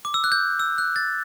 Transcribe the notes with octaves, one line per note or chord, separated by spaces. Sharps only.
D6
E6
F#6
G6
E6
F#6
A6